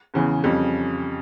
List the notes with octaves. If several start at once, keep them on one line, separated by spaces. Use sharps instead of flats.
E2 C#3 E3
F2 C#3 G3